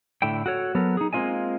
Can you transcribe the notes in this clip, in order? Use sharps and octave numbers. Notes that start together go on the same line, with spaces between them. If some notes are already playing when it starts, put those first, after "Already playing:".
A2 D3 E4 G5
F#4 A4 C#5
F#3 B3 A4 A#4
D#4 G#4
G#3 A#3 C4 F4 D#5 G#5